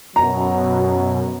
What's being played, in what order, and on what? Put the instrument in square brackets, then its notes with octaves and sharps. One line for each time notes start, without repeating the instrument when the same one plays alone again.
[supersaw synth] F#2 B2 [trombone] F#3 [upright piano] A#5